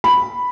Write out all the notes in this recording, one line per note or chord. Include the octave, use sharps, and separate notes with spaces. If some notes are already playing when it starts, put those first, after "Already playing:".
B5